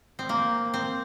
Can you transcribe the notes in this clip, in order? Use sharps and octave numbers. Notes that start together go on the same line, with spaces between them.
C4
A#3
C4